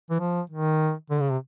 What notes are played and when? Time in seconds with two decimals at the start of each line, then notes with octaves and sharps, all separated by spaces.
0.10 E3
0.20 F3
0.50 D#3
1.10 D3
1.21 C#3
1.30 C3